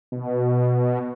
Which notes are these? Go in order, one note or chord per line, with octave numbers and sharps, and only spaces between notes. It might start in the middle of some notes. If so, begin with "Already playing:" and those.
B2